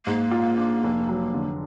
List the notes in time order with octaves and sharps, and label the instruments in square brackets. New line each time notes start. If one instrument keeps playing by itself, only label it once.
[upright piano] G#2 [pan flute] A#3
[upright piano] F4
D4
F1
F#3
D3